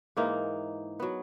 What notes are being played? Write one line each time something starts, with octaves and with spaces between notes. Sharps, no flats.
G#2 E3 A#3 D#4
F#3 B3